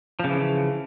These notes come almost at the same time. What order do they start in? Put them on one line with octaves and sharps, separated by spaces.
F3 C#3 E3